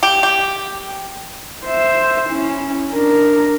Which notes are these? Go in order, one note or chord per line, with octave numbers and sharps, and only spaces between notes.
G4
G4
C5 E5
C#4 E4
D4 A#4